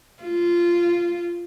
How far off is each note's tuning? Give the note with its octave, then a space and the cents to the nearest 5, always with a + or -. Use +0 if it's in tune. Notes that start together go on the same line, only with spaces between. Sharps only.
F4 -10